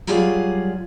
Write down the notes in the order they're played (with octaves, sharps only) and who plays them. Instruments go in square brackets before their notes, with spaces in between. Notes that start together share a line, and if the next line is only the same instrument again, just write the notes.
[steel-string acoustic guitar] F#3 G3 F4 G#4 D5 F5